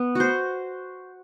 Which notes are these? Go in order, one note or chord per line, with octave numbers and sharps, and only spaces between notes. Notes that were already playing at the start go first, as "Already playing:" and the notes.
Already playing: B3
F#4 C5